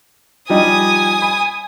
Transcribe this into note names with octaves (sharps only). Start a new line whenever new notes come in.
F3 G3 D#4 G#5 D#6
B5